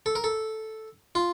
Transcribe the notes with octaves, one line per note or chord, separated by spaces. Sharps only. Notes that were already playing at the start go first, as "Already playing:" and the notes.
A4
A#4
A4
F4